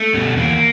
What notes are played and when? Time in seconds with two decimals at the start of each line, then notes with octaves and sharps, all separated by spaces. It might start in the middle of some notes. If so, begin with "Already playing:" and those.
Already playing: A3
0.14 B2 G3
0.37 E2 A#3